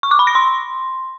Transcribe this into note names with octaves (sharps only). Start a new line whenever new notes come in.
C#6
D6
B5
A#6
C6